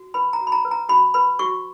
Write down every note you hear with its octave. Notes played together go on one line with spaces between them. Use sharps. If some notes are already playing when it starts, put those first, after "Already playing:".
Already playing: F#4
B4 B5
A#5
F#4
B5
A#5
B4
A#5
F#4 B5
B4 B5
F#4 C#6